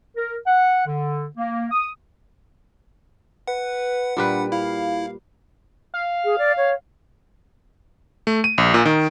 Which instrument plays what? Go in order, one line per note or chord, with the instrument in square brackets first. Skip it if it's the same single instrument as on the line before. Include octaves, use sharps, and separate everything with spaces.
[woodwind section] A#4
F#5
D3
A#3
D#6
[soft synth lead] B4 [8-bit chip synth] F#5
[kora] A#2 G3 B4 [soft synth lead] D4
[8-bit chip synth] E4 [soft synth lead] F5
[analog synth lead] F5
[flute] G#4
D5
C#5
[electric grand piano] A3
D#7
A#1
A#2
D#3